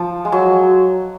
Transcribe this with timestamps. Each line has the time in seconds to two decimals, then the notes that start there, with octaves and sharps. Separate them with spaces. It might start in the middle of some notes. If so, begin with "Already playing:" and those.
Already playing: F3
0.25 G#3
0.32 F#3